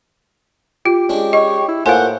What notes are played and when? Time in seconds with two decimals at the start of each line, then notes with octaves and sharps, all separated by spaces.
0.86 F4 G4
1.09 G#3 C#4 D4
1.33 C#5 D#5
1.68 E4
1.86 A2 A#3 F4 C5 F5 F#5 G#5